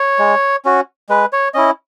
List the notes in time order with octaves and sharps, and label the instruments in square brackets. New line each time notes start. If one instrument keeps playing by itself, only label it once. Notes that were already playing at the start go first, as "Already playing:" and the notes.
Already playing: [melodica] C#5
G#3
C#4 F#4
G#3 B4
C#5
C#4 E4 D#5